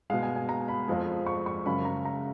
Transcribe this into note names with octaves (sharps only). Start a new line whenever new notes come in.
B2 G#3 F5
G#5
G#5
A#5
B5
F2 F3 G#3
C#6
C#6
F#2 C#3 G#3 B5
A#5
A#5